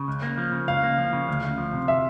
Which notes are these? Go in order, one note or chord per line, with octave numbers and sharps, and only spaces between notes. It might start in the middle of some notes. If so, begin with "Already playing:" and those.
Already playing: C#3
C#2
A#3
F3
C#3
C#2 F5
A#3
F3
C#3
D2
D2
F3
C3
E5